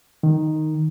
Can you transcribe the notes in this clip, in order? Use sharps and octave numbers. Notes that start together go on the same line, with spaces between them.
D#3